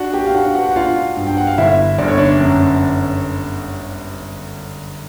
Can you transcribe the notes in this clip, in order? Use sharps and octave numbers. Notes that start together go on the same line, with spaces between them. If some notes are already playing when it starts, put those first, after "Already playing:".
Already playing: D4 F#4 F#5
G4 G5
F5
D4 F#4 F#5
F#4 F#5
F#5
D4 F4 F5
G2
G5
F#5
F5
G1 E4 E5
G1 D5
C#5
D4 D5
F#2